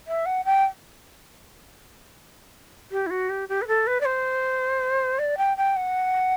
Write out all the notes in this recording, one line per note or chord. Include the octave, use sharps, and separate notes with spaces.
E5
F#5
G5
G4
E4
F#4
G4
G4
B4
A4
B4
D5
C5
D5
G5
G5
F#5